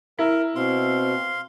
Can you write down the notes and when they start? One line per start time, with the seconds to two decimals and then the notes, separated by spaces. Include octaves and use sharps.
0.19 E4 A#4
0.56 B2 C4 F5 C6